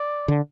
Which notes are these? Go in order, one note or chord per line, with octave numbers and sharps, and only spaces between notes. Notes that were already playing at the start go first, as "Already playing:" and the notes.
Already playing: D5
D3